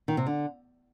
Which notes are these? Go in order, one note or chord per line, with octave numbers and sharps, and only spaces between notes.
D#3
C3
D3